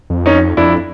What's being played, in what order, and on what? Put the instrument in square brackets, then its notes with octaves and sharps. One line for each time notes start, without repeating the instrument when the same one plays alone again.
[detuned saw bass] F2
[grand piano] C#4 D#4
[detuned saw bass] F2 [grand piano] D4 E4